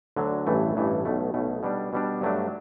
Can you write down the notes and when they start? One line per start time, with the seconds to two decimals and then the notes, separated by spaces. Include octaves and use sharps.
0.16 D2 D3 F#3
0.47 A1 G2 E3 A3
0.75 A1 G2 E3 A3
1.05 B1 B2 A3
1.34 B1 B2 A3
1.63 B2 G3 D4
1.93 B2 G3 D4
2.21 G2 F#3 A3 D4